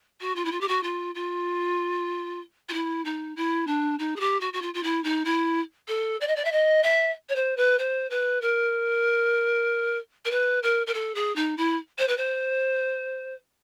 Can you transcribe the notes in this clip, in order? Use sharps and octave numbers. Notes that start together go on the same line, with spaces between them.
F#4
F4
E4
F4
G4
F#4
F4
F4
F4
E4
D#4
E4
D4
D#4
G#4
G4
F#4
F#4
F4
F4
E4
D#4
E4
A4
D5
D#5
D5
E5
D#5
E5
C#5
C5
B4
C5
B4
A#4
A#4
B4
A#4
A#4
A4
G#4
D#4
E4
C5
B4
C5